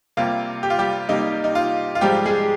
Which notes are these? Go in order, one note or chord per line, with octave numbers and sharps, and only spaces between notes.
C3 G3 A#3 F4
G4
F4
G3 G4
C3 G3 A#3 D#4
D#4
F4
F4
G#2 F3 G3 G#3 G4
G#3 G#4